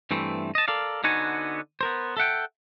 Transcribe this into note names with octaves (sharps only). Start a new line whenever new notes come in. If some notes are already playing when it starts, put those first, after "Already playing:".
G2 E3 A3 C4
D#5 A5
A4 A#4 D5 F5
D3 B3 D#4 F#4 C5 G#5
B3 A#4 C5
A4 E5 F#5 G5